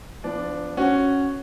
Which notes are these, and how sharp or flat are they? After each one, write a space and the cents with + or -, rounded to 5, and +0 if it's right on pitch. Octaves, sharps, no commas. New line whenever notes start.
F3 +0 B3 +40 D4 +0
C#4 +0 F#4 +0